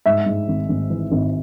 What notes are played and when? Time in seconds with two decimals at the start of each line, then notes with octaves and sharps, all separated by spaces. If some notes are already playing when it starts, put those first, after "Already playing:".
0.06 G#2 E5
0.26 G#2
0.48 G#1
0.69 G#1
0.90 E3
1.12 G#1